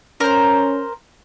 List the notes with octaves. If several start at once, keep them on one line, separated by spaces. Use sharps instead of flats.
C#4 A#4 C5